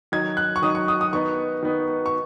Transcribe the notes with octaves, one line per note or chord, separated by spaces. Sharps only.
D#3 F#3 D#4 G#6
F#6
C#6
D#3 F#3 D#4 D#6
C#6
D#6
D#6
D#3 B3 D#4 C#6
D#3 B3 D#4
C#6